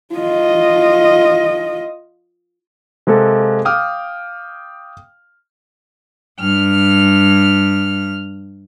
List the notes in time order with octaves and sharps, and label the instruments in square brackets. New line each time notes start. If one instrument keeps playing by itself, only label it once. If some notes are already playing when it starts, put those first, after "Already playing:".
[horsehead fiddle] F4 D#5
[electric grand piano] C3 G#3 A#3 A4
F5 G5 D6 D#6 F6
[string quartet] G2 F6